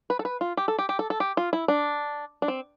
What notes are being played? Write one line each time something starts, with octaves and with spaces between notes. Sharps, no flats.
B4
A4
B4
F4
G4
A4
G4
G4
A4
A4
G4
F4
E4
D4
D4
C4